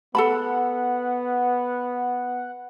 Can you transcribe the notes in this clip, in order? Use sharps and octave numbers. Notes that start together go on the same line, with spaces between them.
B3 A4 F#5 A5 B5